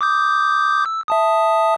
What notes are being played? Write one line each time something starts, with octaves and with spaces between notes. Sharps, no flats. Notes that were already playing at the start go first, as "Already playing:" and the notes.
D6 D#6 G6
E6
E5 A5 D#6